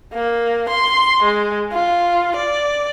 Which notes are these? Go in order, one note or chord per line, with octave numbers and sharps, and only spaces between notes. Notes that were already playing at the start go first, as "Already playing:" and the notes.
A#3
C6
G#3
F4
D5